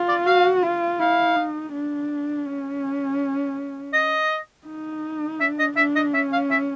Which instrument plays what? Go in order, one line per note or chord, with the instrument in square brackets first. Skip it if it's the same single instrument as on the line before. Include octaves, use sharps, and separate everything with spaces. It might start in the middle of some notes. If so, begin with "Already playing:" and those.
Already playing: [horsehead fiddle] F4
[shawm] D5
[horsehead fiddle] F#4 [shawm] F5
[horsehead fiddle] F4
[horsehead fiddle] E4 [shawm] F5
[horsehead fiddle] D#4
D4
C#4
[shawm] D#5
[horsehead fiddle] D#4
[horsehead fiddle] D4 [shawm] E5
[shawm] D#5
[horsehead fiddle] D4 [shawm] E5
[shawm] D#5
[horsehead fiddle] C#4 [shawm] E5
[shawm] F5
E5